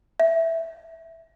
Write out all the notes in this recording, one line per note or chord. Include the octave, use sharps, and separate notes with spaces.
E5